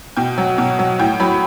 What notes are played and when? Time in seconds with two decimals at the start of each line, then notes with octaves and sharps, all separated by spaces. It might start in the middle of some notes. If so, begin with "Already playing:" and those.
0.17 B2 G5
0.38 F#3
0.58 B2
0.79 F#3
0.99 A2 G5
1.20 F#3 B5